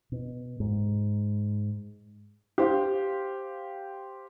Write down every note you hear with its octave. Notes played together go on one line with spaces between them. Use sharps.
B2
G#2
G4 C5 F5